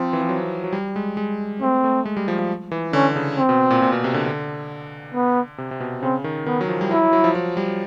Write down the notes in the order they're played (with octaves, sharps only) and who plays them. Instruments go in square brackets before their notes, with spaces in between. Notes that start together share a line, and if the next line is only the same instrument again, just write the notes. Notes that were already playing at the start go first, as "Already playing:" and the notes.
Already playing: [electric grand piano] F3 [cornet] C4
[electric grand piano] E3
F3
F#3
F#3
G3
G#3
G#3
[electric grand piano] A3 [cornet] C4
[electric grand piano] A3
G#3
G3
F3
F3
E3
[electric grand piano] D3 [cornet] C#4
[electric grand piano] C#3
[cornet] C4
[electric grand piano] B2
A#2
A#2
B2
C3
D3
D3
[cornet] B3
[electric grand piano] C3
C3
B2
[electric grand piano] C#3 [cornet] C4
[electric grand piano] D#3
[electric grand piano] D#3 [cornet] B3
[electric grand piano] F#3
F3
G3
[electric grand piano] F#3 [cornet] E4
[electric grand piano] F#3
F#3
F3
F3
G3